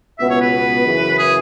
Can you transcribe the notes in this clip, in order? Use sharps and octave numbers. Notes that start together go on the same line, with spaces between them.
C#2 B2 B3 E5
C#5
B4
F#2 C#3 E3
G#4